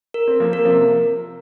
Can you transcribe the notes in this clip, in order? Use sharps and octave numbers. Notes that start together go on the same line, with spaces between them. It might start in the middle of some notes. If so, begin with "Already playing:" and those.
A#4
C4
F3 A#3
A#4
C3 F3